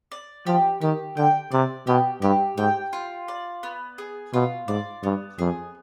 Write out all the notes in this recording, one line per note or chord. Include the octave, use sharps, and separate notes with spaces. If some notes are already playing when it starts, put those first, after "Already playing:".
D5
F3 G4
D#3 G4
D3 G5
C3 D5
B2 G4
G2 G4
G#2 G5
F4
D5
B3
G#4
B2 F4
G#2 D5
G2 B3
F2 G#4